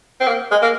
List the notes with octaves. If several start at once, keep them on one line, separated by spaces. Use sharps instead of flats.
C4
A#3
G#3
A#3